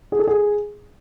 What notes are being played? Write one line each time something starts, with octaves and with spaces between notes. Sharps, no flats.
G#4
A4
G#4